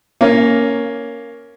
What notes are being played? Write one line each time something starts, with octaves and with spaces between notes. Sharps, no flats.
A#3 C#4